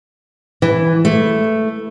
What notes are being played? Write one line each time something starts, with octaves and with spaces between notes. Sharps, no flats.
E3
A3